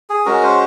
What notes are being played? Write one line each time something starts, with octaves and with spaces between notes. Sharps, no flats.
G#4
G#3 C#4 F#4 A#4
C5